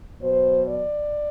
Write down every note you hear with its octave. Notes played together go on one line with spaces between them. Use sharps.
B2 F#3 C5
D5